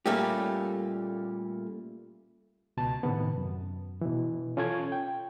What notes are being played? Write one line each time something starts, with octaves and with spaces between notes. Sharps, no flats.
A#2 G3 A3 A#3 C#4 G4
C#2 B2 A5
A2 C3 D#3 B3
F#2
B2 E3
C#4 F4 A4 C#6 G#6
G5